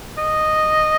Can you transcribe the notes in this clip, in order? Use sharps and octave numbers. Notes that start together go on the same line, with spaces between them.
D#5